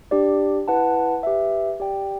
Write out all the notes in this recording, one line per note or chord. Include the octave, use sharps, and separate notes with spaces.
D4 G4 D5
E4 B4 F#5 A5
G4 B4 E5
G4 D5 G5